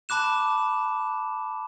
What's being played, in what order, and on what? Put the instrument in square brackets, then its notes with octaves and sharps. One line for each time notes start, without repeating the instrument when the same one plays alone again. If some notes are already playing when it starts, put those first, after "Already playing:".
[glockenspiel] A5 B5 D6 F#6 E7